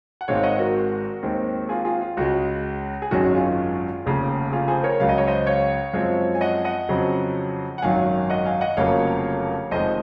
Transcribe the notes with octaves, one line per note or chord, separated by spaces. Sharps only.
F#5
G#1 G#2 D#3 G#3 C4 C#5 F5
D#5 F#5
F#4 A#4
D#2 D#3 G#3 C4
F4 G#4
F4 G#4
F4
C#2 C#3 G#3 F#4
G#4
G#1 F#2 D#3 G#3 C#4 F#4
F4 G#4
F1 D#2 C#3
F4 G#4
G#4 C5
A#4 C#5
C#2 C#3 F#3 F5
D#5
C#5
C5 D#5
C#5 F5
F#2 F3 G#3 C4
G#5
D#5 F#5
D#5 F#5
F2 C#3 F#3 C4
F#5
G#1 F#2 D#3 F#3 F5 G#5
D#5 F#5
F5 G#5
D#5 F#5
F1 F2 C#3 F#3 A#3 C#5 F5
F1 F2 D#3 G#3 C5 D#5